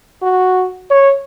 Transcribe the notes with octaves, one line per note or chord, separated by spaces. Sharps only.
F#4
C#5